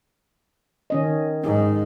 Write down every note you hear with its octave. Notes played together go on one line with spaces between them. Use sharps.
D#3 C#4 D#5
G#2 D#4